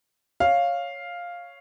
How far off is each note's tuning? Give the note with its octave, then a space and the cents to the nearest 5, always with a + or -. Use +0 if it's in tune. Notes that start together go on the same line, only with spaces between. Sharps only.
C#5 +0 F5 +0